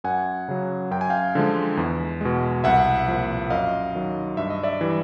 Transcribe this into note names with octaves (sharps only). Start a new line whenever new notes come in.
F#2 F#5 G#5
C#3 F#3
F#2 G5
G#5
F5 G5
D3 F3 G#3
E2
B2 G#3
C2 E5 F#5
A#2 F3
F#2 D#5 F5
D#3 F#3
G2 E5
D#5
D5 E5
E3 G3